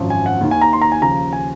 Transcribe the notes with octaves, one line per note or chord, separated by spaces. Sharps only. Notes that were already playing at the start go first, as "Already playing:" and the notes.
Already playing: G#1 F#2 F3
G#5
F#5
D#2 D#3
G#5
A#5
C6
A#5
G#5
D#2 C#3 F3 A#5
G#5